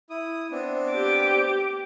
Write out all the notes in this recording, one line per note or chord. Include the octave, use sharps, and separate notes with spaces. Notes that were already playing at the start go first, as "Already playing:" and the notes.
E4 D#6
B3 C4 D4
G4 D6